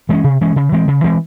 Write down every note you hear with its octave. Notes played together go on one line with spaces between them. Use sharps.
E3 G#3 C#4
C3
E3 G#3 C#4
C#3
E3 G#3 C4
C#3
E3 G#3 C4